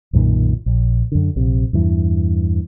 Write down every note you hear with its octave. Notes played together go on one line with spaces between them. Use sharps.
B1 F#2 A#2 D#3
A#1
F#2 D3
A#1 C3
E2 G2 E3